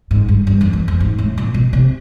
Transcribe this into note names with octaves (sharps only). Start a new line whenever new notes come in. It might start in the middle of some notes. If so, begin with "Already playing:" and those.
G#2
G2
G2
F2
E2
F2
G#2
A2
A#2
B2
C3